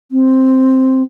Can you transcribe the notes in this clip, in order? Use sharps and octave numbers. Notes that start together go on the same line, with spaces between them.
C4